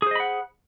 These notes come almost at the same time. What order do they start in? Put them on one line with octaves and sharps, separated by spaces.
G#4 C5 D#5 B5 F#5